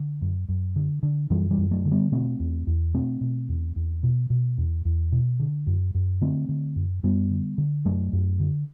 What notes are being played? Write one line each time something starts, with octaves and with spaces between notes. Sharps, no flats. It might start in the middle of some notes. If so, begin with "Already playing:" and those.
Already playing: D3
F#2
F#2
D3
D3
F#2 E3 G3
E3 G3
F#2
F#3 A3
D3
G3 B3
B2 A3 C4
E2
E2
B2 A3 C4
B2
E2
E2
B2
B2
E2
E2
B2
D3
F#2
F#2
D3 A3 C4
D3
F#2
F#2 G3 B3
D3
D3
F#2 F#3 A3
F#2
D3